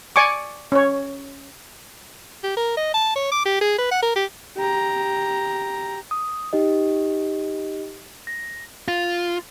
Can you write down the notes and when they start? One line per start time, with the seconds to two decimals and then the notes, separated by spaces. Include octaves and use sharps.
0.16 D5 G#5 C#6 D6
0.72 C#4 C#5
2.44 G4
2.57 A#4
2.77 D#5
2.94 A5
3.15 C#5
3.31 D6
3.45 G4
3.61 G#4
3.78 B4
3.91 F#5
4.03 A#4
4.16 G4
4.57 G4 A#5
6.11 D#6
6.53 D#4 G4 D#5
8.27 A#6
8.88 F4